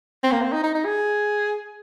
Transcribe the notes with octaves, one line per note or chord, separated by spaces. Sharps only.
C4
A#3
C4
D#4
D#4
D#4
G#4